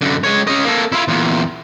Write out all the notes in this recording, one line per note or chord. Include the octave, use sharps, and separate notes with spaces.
F#2 D3
G#3 C#5
C#4 D#5
A#3 A4
E4 F4
E2 A#2